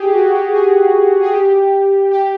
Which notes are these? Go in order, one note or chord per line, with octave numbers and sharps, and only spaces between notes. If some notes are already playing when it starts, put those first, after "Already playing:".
Already playing: G4 G#4
F#4
G4
G#4
G#4
G4
G4